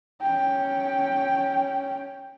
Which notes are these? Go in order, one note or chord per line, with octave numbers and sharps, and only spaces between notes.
C#4 G5